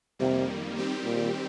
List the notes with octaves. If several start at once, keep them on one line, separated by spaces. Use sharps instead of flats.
F2 C3 D#3 G3 A#3
D#3 G3 C4 G4
A#2